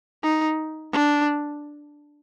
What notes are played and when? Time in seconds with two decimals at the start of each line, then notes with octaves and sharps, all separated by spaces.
0.23 D#4
0.92 D4